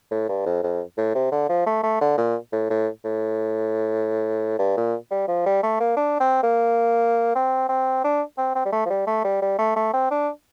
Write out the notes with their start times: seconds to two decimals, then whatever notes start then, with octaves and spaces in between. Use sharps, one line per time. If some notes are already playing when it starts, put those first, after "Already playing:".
0.11 A2
0.29 G2
0.46 F2
0.63 F2
0.98 A2
1.15 C3
1.32 D3
1.49 F3
1.67 A3
1.83 A3
2.01 D3
2.18 A#2
2.53 A2
2.70 A2
3.04 A2
4.59 G2
4.77 A#2
5.11 G3
5.28 F3
5.46 G3
5.63 A3
5.80 A#3
5.97 D4
6.20 C4
6.43 A#3
7.35 C4
7.69 C4
8.04 D4
8.38 C4
8.55 C4
8.65 G3
8.72 A3
8.85 F3
8.90 G3
9.07 A3
9.24 G3
9.42 G3
9.59 A3
9.76 A3
9.94 C4
10.11 D4